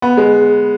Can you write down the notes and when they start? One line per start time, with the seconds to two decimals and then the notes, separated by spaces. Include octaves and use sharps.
0.02 B3
0.17 G#3